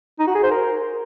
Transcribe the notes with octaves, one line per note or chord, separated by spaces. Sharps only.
D#4
F#4
G#4
C5
A#4